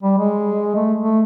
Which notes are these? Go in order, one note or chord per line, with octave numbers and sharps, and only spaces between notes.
G3
G#3
A3
A3